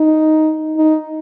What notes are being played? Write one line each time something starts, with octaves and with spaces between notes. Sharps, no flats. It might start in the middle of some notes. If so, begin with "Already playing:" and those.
Already playing: D#4
D#4